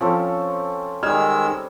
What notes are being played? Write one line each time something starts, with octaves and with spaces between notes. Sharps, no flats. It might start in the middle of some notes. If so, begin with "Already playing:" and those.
F3 C4 C#4 A4
D#3 G3 G#3 D#5 E6 F6 G#6